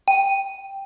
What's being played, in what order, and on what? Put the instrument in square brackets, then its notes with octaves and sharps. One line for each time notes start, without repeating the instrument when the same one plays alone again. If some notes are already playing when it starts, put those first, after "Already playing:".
[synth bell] G5